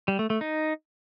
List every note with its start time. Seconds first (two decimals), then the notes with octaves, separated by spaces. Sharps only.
0.08 G3
0.19 A3
0.30 A3
0.41 D#4